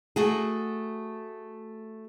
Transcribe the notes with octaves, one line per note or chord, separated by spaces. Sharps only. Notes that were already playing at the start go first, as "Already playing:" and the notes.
A3 F#4 G#4